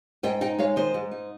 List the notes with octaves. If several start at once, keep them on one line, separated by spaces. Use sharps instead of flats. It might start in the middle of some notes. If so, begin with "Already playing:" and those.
G#2 D#5 G5
D#4 D#5 G5
G#3 C#5 F5
D#3 C5 D#5
G#2
D#4